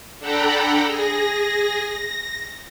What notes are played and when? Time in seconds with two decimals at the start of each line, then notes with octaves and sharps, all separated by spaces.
0.19 D4 A4 F#5 G5 A#5 B5
0.86 G#4 A#6
1.83 A#6